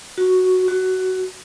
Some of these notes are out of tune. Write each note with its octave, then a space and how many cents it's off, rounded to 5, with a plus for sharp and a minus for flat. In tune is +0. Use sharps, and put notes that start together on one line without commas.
F#4 +0
F#4 +15